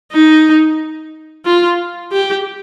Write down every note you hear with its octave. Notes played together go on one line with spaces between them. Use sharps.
D#4
F4
G4